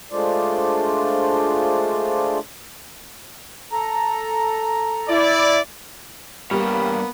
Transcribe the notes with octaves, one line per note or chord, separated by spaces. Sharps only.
G#3 A3 D4 F4 C5 D5
A4 A#5
E4 D5
G2 G3 A#3 B3 C#5